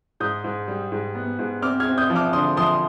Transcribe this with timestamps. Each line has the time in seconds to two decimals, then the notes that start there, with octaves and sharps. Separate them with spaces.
0.20 G#2 D#6 G6
0.44 G#2
0.68 G3
0.92 G#2
1.15 B3
1.39 G#2
1.62 C4 D6 F6
1.80 F6 G#6
1.86 C4
1.98 D#6 G6
2.10 F3
2.16 D6 F6
2.33 D3 C6 D#6
2.57 F3 C6 D#6